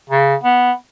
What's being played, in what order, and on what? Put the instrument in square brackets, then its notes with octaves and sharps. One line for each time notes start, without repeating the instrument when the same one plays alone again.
[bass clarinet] C#3
B3